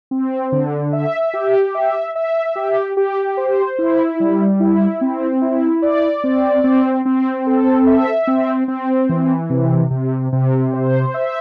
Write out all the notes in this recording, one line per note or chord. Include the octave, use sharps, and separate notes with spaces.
C4
D3
E5
G4
E5
E5
G4
G4
C5
E4
G3
E4
C4
E4
D5
C4
C4
C4
A4
E5
C4
C4
E3
C3
C3
C3
C5
E5